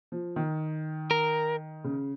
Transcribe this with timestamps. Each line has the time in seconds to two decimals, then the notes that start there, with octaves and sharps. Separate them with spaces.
0.12 F3
0.36 D#3
1.11 A#4
1.84 C#3